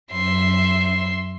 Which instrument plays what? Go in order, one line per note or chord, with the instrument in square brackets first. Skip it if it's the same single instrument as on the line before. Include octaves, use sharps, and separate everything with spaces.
[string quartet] F#2 E5 C6